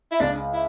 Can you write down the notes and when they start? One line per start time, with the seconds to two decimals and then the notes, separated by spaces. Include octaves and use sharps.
0.11 E4
0.20 C#2 D4
0.53 E4